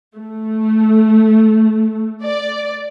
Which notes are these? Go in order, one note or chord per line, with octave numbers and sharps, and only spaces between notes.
A3
D5